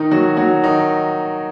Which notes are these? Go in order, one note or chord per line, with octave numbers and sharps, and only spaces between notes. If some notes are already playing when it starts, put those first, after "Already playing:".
Already playing: D#3 D#4
F#3 F#4
F#3 F#4
D#3 D#4